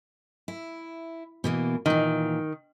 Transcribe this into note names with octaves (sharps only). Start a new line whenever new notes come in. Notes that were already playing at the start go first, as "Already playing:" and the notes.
E4
B2 E3 A#3
A#2 D#3 E3